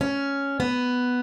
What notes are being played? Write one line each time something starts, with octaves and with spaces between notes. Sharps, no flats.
C#4
B3